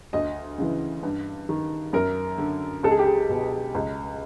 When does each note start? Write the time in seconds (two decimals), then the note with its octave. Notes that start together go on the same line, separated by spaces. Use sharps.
0.13 D2 D#5
0.58 C#3 E3
1.03 G2
1.49 D#3
1.93 F#2 A#4
2.38 D3
2.83 C#2 A4
2.91 G#4
2.99 G4
3.07 G#4
3.29 B2
3.75 C#2